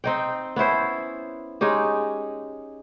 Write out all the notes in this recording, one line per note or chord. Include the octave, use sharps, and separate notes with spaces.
C4 D#4 G5
B3 C#4 E4 C5
G#3 C#4 D#4 G4